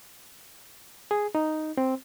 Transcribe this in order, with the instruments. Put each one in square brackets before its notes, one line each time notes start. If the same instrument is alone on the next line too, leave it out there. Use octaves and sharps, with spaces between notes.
[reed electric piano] G#4
D#4
C4